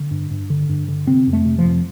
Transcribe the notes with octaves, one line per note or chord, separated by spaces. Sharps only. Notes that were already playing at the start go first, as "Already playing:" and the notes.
Already playing: D3
G2
G2
D3
G2
D3
C3 C4
F2
A3
C3
F3
F2